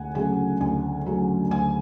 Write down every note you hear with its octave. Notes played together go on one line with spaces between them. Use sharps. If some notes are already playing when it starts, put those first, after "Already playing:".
Already playing: D2 F#5 G#5
C#3 F#3 A3 G#5
D2 G#5
C#3 F#3 A3
D2 G#5